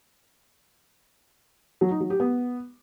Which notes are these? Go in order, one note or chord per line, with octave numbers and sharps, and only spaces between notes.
F#3
D#4
F#3
G4
B3